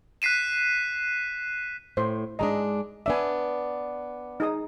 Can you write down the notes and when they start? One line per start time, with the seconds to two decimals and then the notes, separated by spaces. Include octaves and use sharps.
0.22 F#6 B6 C7 D#7 E7
1.97 A2 C5
2.39 G#2 G#3 D4 D#5 A#5
3.06 B3 D4 D5 E5 G#5
4.40 D#4 G#4 D#6